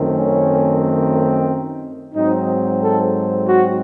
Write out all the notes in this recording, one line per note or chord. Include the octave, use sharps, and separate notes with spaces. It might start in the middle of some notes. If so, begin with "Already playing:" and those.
Already playing: F#2 D#3 A3 C4
C#4
G#2 F#3 C4 D#4
A4
F#4